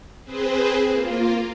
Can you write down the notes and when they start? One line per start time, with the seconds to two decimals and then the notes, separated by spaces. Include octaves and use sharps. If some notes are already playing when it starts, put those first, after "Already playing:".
0.24 C4 G#4 B4 C5
0.89 A#3 F4